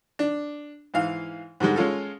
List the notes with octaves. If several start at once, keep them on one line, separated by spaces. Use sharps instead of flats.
D4
G#2 E3 F5
G#2 D3 G3 G#3
G#3 C#4 F4 A4